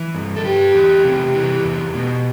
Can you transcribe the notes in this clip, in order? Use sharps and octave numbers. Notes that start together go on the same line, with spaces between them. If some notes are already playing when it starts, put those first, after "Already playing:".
Already playing: E3
G2
A4
G2 G4
E2
C3
E3
E2
B2